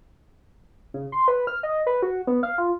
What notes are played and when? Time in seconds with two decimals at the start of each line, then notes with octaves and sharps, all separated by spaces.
0.94 C#3
1.12 C6
1.28 B4
1.47 F6
1.63 D#5
1.87 B4
2.02 F#4
2.27 B3
2.43 F5
2.58 F4